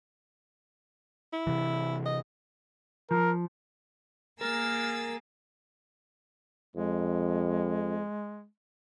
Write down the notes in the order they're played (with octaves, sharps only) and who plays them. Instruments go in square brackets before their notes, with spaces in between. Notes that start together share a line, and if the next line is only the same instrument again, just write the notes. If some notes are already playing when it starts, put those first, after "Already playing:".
[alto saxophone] E4
[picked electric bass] C3 E3
[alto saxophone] D#5
[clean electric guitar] F3 [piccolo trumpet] A#4
[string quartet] A#3 G#4 [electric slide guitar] A#4 [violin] E6 A6 [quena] F6
[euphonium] F2 [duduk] G#3